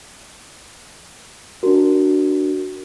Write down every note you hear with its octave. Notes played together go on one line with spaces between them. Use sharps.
D4 F#4 A#4